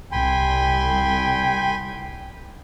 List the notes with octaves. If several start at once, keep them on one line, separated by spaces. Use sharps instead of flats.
C2 G5 G#5 B5 C6